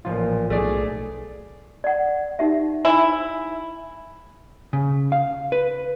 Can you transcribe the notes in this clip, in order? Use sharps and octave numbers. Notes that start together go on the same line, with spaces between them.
A1 A#2 F3 F4
B1 A3 G#4 D5
D5 F#5
D#4 G4 E5
E4 G#5
C#3
F5
B4